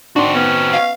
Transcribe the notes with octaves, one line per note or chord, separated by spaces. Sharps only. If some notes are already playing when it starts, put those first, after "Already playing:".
C4 D4 F#4 C6
B3 C#4 F#5
F5